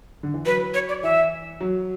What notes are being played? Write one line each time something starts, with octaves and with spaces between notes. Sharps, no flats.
D3
E3
F#3 B4
C#5
D5
E3 E5
F#3